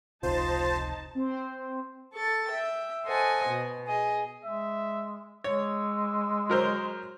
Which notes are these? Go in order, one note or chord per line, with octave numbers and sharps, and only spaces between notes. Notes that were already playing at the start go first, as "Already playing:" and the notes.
F1 C#2 C3 D#4 F4 C5 A5
C4 C5
A4 C#6 A6
E5 G5
A4 C5 D#5 F#5 G#5
B2
G#4 D#5
G#3 E5
G#3 C#5 E6
F#3 A#4 C5